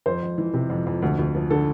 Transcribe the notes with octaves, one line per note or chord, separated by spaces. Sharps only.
F2 C5
F2
E3
C3
F2
F2
D2
D2
F3
D3 A4